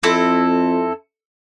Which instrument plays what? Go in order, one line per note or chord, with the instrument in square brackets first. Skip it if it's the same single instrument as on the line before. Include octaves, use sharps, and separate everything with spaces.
[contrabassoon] F2 [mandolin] C4 E4 A4